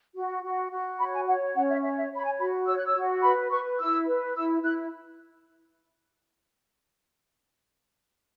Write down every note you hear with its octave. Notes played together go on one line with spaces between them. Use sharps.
F#4
F#4
F#4
C#5 B5
G#5
C#5 F#5
C#4 F#5
E5
C#5 E5
E5
C#5 B5
G#5
F#4 B5
C#5 E6
F#6
E6
F#4
B4 B5
B4 C#6
E4 E6
B4
E4 E6
E4 F#6